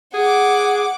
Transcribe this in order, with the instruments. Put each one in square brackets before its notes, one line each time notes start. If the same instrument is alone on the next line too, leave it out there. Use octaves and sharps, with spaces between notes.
[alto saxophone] G#4 [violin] F#5 D6